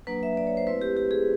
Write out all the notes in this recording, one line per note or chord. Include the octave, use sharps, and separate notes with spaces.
F#3 A#3 D4 B4
E5
D5
C#5
C5
A3 C4 E4 B4
G4
G4
G#4